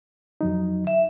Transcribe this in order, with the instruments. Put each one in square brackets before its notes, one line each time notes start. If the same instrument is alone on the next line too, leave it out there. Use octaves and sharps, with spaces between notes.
[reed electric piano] F2 F#3 D#4
[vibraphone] E5